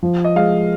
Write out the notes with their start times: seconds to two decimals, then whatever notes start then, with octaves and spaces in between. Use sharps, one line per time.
0.03 F3
0.24 D#5
0.36 G#3 F5